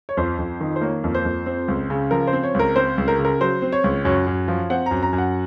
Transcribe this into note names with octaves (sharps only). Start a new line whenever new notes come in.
C#5
F2 C5
F2
D#3
C5
A#3 C#5
F2
C5
F2
C4
C#2
C#3
F3 A#4
C5
C4
C#5
C#2
A#4
C4 C5
C#2
A#4
C#3
A#4
F#3 C5
C4
C#5
C#2
F#2 C#5
F#2
F3
C4 F#5
F#2 A#5
A#5
F#2
F#5